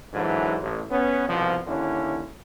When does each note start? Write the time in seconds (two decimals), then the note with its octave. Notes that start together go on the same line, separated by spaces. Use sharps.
0.14 G#2 D3 E3 F#3
0.62 A1
0.91 B3 C#4
1.29 C2 B2 F3
1.67 D#2 D3 C#4 E4